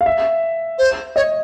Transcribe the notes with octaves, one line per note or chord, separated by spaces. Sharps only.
F5
E5
C5
C#5 D#5